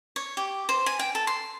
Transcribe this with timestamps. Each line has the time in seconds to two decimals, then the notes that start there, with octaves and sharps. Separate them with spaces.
0.16 C#5
0.37 G4
0.69 C5
0.86 G#5
0.99 G5
1.15 A4
1.27 C6